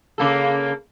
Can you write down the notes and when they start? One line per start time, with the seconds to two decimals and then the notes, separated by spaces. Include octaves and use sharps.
0.18 C#3 A#3 A4